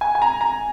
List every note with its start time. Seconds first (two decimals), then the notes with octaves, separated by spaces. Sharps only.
0.01 G#5
0.15 G#5
0.22 A#5
0.41 A#5